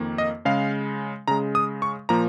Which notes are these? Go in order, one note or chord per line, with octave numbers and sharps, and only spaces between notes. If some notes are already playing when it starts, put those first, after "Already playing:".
Already playing: F2 D#3 A#3
D#5
C#3 G#3 F5
C#3 G#3 A#5
D#6
C#6
A#2 F3 A#3 A#5